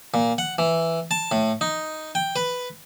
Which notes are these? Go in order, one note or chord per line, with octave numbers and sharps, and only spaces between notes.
A#2
F#5
E3
A5
A2
D#4
G5
B4